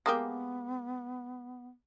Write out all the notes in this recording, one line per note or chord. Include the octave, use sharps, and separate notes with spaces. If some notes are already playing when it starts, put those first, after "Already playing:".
G#3 A#3 B3 G4